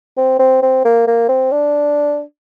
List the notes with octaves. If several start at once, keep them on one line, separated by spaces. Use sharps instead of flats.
C4
C4
C4
A#3
A#3
C4
D4